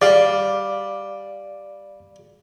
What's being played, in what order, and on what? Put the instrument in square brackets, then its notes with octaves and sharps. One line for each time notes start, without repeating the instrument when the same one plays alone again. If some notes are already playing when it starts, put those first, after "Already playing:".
[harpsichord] G3 [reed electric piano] D5 F5 D6